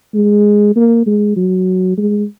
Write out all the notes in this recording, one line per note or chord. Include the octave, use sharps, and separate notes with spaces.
G#3
A#3
G#3
F#3
G#3